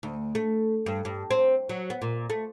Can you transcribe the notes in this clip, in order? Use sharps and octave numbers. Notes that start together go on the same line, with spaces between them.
D2
A3
G2
G2
C4
F#3
B3
A#2
A3